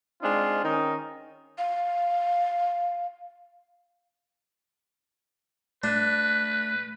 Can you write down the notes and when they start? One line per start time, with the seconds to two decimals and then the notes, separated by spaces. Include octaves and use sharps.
0.22 G#3 C4 D4 D#4 F4
0.64 D#3 C#4 D#4
1.58 F5
5.84 A3 D4 B4